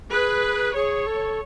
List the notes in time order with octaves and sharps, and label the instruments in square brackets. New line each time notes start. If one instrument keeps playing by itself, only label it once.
[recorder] G#4 [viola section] B4
[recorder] G#4 [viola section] C#5
[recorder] A4